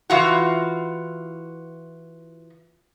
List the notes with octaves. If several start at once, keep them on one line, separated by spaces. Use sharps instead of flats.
E3 F4 F#4